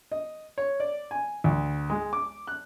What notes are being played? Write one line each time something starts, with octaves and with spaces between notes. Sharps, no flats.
D#5
C#5
D5
G#5
D2
G#3
D6
F#6